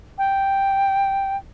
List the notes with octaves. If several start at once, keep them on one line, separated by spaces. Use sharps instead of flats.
G5